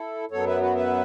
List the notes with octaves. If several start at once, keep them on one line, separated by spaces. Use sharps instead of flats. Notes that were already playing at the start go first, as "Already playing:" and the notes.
Already playing: E4 A4
F#2 F#3 B3 A4 C#5
B4 E5
F#4 B4
B4 E5